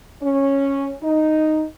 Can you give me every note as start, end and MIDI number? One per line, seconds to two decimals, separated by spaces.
0.22 0.93 61
1.03 1.64 63